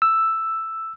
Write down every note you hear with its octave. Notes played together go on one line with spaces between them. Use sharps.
E6